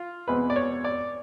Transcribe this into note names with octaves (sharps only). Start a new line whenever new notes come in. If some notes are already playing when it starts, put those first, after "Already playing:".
Already playing: F4
E2 B2 G#3 C4 B4
D5
C#5
D5